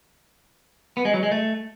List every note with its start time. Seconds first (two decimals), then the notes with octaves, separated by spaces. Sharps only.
0.97 B3
1.05 G#3
1.14 F#3
1.23 G#3
1.31 A3